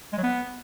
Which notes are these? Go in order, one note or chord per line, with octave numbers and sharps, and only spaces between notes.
G#3
F#3
B3